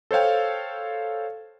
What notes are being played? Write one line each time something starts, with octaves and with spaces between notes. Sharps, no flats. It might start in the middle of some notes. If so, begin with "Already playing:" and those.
A4 C5 C#5 F5 G5